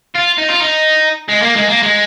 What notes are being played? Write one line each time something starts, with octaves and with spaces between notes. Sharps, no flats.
F4
D#4
F4
D#4
G#3
A#3
G#3
A#3
G#3